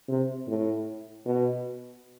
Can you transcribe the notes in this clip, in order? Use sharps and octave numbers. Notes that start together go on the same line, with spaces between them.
C3
A2
B2